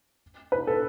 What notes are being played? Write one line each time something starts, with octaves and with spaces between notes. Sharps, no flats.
B4
A4